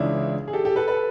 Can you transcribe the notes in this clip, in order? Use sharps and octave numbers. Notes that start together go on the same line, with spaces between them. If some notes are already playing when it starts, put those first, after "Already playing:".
Already playing: C#2 C#3 E3 D4 E4
G#4
G4 A4
G4 A4
A4 B4
A4 B4